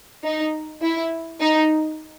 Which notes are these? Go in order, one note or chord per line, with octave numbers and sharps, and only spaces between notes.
D#4
E4
D#4